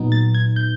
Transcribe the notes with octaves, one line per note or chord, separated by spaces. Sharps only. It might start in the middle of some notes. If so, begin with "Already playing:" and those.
Already playing: A#2 F#3 B3 D#4
A6
G#6
G6